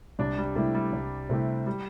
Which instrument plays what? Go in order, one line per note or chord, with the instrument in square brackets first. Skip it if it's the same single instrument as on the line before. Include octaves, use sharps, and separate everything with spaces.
[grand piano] C2 [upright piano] D4
[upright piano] G3
[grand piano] C3 A3 E4 G4 [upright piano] G3
[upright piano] G3
[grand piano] C2
C3 A3 E4 G4
[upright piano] G3